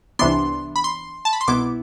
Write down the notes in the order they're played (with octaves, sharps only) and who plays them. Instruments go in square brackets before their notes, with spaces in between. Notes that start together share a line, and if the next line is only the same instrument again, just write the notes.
[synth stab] C2 C3 E3 B3 D4 C6
B5
C6
A5
B5
C6
C2 B2 B3 E4 D6